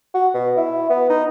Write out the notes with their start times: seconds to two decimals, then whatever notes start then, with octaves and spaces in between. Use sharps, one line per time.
0.14 F#4
0.34 B2
0.57 E4
0.90 B3
1.09 D#4